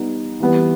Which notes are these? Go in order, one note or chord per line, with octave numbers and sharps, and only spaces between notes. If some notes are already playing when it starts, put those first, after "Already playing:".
Already playing: G3 B3 D#4
E3 G3 B3